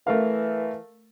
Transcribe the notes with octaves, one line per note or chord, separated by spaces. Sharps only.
E3 A3 A#4 F5